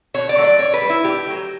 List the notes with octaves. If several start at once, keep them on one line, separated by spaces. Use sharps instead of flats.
B2 C#5
D5
F#3 A3
D5
A2 C#5
B4
G3
E4
A2 G4
F#3 A3